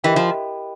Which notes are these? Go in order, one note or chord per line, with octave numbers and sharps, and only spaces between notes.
E3 G4 A#4 D#5 G5 B5
F3